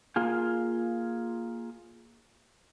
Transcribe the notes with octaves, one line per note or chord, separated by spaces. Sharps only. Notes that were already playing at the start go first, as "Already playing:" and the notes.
A#3 F4 G#4